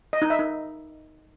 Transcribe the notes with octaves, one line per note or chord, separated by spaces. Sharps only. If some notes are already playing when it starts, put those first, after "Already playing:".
D#5
D#4
E5
D#4